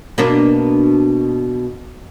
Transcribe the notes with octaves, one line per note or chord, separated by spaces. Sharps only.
B2 A#3 D4